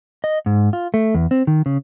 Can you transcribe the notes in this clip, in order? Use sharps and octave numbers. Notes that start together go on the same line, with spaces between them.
D#5
G#2
F4
A3
E2
C4
D#3
C#3